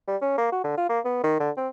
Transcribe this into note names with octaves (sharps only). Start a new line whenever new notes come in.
G3
C#4
A#3
F#4
D3
F4
A#3
B3
D#3
D3
C4